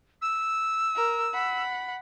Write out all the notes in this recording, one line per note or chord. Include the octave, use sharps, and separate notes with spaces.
E6
A#4
F#5 B5